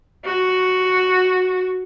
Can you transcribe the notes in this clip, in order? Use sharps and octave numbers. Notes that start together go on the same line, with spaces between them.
F#4